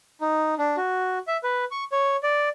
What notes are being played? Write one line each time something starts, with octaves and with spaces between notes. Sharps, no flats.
D#4
D4
F#4
E5
B4
C#6
C#5
D5